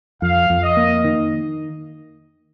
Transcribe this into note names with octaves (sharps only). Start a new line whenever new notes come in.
F2 F5
F2
D#5
A#3
D#3